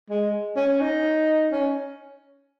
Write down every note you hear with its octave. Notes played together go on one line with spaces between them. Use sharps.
G#3
C#4
D#4
C#4